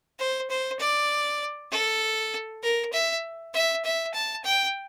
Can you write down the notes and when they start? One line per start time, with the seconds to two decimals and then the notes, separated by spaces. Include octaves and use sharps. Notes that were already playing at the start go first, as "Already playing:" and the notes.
0.19 C5
0.50 C5
0.80 D5
1.71 A4
2.63 A#4
2.93 E5
3.54 E5
3.85 E5
4.14 A5
4.44 G5